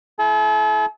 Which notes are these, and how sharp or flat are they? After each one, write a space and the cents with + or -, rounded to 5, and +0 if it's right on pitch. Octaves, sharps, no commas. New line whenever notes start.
E4 +0 A4 -45